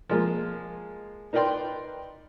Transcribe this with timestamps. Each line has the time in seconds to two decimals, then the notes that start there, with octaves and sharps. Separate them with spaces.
0.10 F3 G#3 A#3
1.33 D#4 A#4 B4 D5 G5 C6